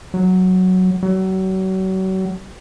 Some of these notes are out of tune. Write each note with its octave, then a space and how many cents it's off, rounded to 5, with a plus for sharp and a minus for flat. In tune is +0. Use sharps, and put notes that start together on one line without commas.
F#3 +0
F#3 +35